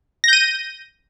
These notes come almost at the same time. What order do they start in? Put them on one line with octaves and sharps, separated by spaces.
A#6 G6 D#7